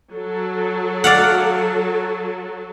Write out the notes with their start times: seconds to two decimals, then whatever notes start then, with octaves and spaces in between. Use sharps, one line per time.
0.13 F#3 A4
1.04 D5 F5 F#5